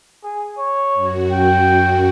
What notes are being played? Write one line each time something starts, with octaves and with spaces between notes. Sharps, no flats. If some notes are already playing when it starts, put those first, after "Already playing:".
G#4
C#5
F#2 F#4
G5